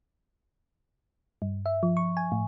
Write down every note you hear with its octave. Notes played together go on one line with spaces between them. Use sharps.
G2
E5
F3
C#6
G#5
A2